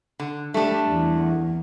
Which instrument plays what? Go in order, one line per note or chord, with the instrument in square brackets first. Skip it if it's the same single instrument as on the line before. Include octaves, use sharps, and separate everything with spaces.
[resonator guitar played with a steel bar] D3
[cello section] G3 [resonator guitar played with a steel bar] A3 D4
[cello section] E2